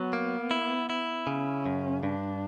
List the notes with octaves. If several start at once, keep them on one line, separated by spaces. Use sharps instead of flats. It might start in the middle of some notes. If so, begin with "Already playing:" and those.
Already playing: F#3 B3
A#3
E4
E4
C#3 C#4
F#2
G2 D4